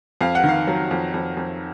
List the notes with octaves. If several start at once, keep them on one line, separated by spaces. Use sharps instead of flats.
F2 F5
F#5
D#3
F5
F#3
F2
F2
F2